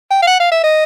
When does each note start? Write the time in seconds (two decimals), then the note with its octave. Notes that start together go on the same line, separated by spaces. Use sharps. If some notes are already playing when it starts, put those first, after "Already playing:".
0.11 G5
0.22 F5
0.27 F#5
0.40 F5
0.52 E5
0.64 D#5